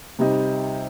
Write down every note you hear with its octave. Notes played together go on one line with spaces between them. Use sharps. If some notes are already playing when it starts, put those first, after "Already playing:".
C3 G3 C4 D#4